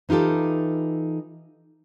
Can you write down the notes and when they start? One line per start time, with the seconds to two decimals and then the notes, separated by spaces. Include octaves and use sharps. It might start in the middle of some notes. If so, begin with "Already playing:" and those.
0.09 E3 D#4 F4 G4 A4